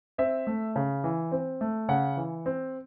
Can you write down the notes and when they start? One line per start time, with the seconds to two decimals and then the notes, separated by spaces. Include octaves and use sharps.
0.18 C4 E5
0.47 A3
0.76 C#3
1.04 E3
1.32 C4
1.61 A3
1.89 C#3 F#5
2.17 E3
2.46 C4